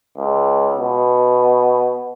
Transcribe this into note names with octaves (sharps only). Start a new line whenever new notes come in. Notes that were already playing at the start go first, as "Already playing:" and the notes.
C#2
B2